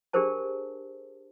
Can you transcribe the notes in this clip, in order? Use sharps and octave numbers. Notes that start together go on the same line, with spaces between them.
D4 G4 G#4 A#4 C5 A5